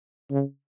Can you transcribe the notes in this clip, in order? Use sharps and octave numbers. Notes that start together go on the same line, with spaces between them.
C#3